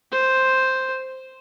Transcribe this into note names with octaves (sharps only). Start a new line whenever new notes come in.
C5